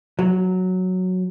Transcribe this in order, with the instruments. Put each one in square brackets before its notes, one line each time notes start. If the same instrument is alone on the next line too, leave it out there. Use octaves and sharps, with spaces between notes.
[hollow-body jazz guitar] F#3